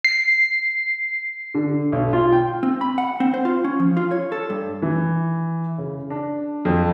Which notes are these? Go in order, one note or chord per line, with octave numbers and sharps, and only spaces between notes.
C7
D3
B1
F4
G5
C4
B5
F#5
C4
C5
F4
C#4
F3
F4
C#5
A4
G2
E3
C#3
D4
F2